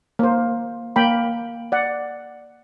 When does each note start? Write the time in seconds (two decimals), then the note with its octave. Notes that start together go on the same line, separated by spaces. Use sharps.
0.19 A#3 C5
0.96 A#3 G5 B5
1.72 D5 F#5